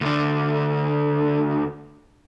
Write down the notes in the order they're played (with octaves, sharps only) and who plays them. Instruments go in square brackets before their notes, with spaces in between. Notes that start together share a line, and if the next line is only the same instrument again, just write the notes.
[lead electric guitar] D2 D3